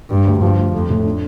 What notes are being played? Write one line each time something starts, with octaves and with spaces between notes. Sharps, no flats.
G2 G3
D2
G2 F3
D2
F2 A3
A2
D4